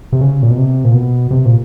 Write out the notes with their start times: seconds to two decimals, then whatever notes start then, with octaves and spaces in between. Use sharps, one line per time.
0.13 C3
0.21 C#3
0.42 A#2
0.50 B2
0.57 C3
0.84 A#2
0.94 B2
1.31 C3
1.45 A#2